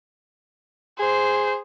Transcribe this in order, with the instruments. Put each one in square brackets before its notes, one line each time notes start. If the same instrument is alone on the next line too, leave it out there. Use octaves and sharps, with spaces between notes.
[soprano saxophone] G#4 [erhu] C5